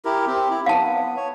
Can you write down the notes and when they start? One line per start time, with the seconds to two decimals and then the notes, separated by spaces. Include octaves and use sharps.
0.05 E4 G4 A#4
0.27 C4 G4
0.50 E4
0.66 B3 F5 A5
1.17 C#5